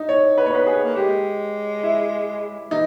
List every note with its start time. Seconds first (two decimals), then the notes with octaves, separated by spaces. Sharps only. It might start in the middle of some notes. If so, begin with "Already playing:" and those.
Already playing: D#4
0.09 C#5
0.38 B4
0.46 A#3 C#5
0.52 B3 B4
0.66 G#4
0.84 A#3
0.95 G#3 G4
1.83 E4
2.71 E3 D#4